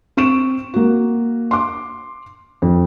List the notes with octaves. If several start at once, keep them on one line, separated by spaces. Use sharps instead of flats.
C4 C#6 D7 E7
A#3 F#4
C6 D6
F2